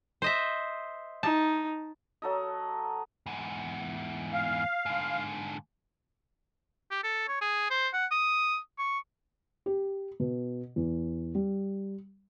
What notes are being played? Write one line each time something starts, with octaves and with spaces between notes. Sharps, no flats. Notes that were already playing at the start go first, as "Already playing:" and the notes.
C5 D#5 E5
D#4 A5
F#3 A4 D#5
E2 G#2
F5
G#2 D3
G4
A4
C#5
G#4
C5
F#5
D#6
C#6
G4
B2
E2
G3